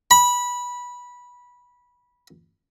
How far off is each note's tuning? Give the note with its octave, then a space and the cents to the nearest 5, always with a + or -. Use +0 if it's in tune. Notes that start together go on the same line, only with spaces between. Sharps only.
B5 -15